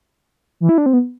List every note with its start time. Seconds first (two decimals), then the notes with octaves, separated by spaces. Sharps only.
0.60 E3
0.69 E4
0.78 D4
0.86 C4
0.93 B3